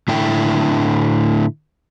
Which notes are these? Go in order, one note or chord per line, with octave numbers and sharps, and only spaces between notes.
A2 D3 E4 G5